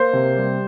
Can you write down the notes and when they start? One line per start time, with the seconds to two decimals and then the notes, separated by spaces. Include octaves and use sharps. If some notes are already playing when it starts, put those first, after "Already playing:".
Already playing: A#3 C5
0.13 C3
0.36 G3